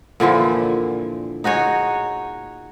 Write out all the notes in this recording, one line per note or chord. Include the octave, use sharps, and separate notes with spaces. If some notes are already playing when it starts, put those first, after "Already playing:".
A#2 D3 E3 F3
D#4 F#4 G#4 C#5